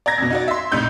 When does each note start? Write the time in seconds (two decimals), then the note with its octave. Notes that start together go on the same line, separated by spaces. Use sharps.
0.06 D5 A#5 G#6 A#6
0.18 F2 B2
0.30 D#4 F#4 D5
0.48 E5 C6
0.72 A#1 A2 C3 D#4 G6